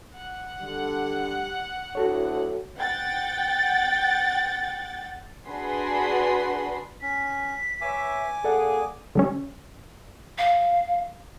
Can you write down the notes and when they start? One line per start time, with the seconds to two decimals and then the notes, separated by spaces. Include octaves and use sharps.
0.15 F#5
0.62 D3 G3
1.95 D2 A2 D4 F#4 A4 C#5
2.78 F#5 G5 A6
5.48 D4 F#4 G#4 B4 B5 C6
7.02 C#4 B6
7.81 B4 C#5 E5 G#5 D6
8.44 A#2 G#4 A4 D5 F#5
9.15 D3 G3 C#4
10.38 F5